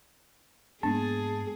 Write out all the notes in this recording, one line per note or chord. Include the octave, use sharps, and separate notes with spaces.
G#2 A#3 B3 D4 G#4 A5